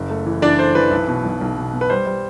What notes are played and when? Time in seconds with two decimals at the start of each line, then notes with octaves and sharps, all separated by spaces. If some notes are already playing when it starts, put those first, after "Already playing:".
Already playing: F#1
0.10 A3
0.26 E3
0.42 E3 D4 D5
0.59 A3 C5
0.75 E3 B4
0.91 B1
1.08 B2
1.25 B1
1.41 B1
1.57 B2
1.73 B2
1.81 B4
1.90 G3 C5
2.07 G3